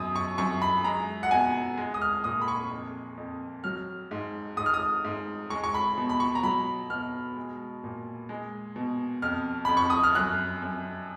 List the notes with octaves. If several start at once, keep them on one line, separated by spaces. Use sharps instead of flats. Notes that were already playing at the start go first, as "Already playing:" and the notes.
Already playing: F#2 B2 D#6
C#6
F#2 C#6
B5
G#3 A#5
F#5
B2 G#5
G#3
D#6
F6
A#2 D#6
B5
C#6
F2
F2
F#3 F6
G#2
G#2 D#6
F6
D#6
G#2
G#3 C#6
C#6
B5
B2
B5
C#6
A#5
F#3 B5
B2 F6
G#3
A#2
G#3
B2
F2 F6
F2 B5
C#6
D#6
F6
F#2 F#6
F#2